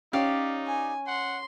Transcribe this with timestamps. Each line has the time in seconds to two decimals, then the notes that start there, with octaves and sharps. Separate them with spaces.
0.13 C#4 D#4 G4 D5 F5
0.66 G#5
1.07 F#5 C6